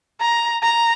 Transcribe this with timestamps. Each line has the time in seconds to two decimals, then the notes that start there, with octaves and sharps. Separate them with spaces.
0.21 A#5
0.63 A#5